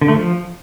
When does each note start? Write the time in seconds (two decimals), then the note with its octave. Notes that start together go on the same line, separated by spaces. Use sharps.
0.01 D3
0.08 A3
0.15 F3